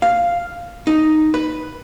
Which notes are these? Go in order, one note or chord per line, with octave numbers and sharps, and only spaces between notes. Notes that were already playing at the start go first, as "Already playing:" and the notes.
F5
D#4
B4